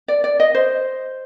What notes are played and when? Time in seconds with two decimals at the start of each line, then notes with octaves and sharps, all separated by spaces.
0.08 D5
0.24 D5
0.40 D#5
0.55 C5